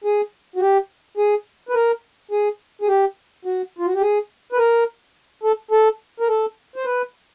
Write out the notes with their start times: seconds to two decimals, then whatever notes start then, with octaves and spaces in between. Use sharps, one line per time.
0.04 G#4
0.56 F#4
0.60 G4
1.17 G#4
1.69 B4
1.74 A#4
2.31 G#4
2.82 G#4
2.88 G4
3.45 F#4
3.79 F4
3.86 F#4
3.94 G4
4.01 G#4
4.53 B4
4.58 A#4
5.43 A4
5.71 A4
6.20 A#4
6.29 A4
6.76 C5
6.85 B4